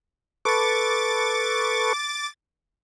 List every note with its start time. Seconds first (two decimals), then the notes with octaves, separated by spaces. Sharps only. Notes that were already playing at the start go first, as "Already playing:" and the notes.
0.45 A4 B4 C#6 D6 A6